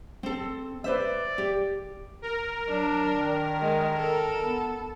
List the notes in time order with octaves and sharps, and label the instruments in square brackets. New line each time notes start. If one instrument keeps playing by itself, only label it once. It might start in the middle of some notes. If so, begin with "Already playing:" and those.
[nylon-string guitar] C4 A4
[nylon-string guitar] B4 C5 E5 [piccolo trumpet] D5
[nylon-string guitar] G4
[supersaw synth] A#4
[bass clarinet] F#3 [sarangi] D4
[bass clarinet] D#3
[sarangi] G#3
A4
[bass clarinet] B3